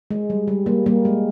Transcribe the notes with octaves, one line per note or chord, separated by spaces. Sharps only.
G#3
G3
G3
G3 A#3
G3 A#3
G#3